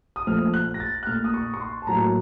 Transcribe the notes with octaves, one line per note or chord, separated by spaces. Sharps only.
D#6
A#2 F3 A3 F6
F#6
A#6
A6
F#6
A#2 A3 F6
D#6
C#6
C#6
C6
A5
A2 F#3 A#3 A#5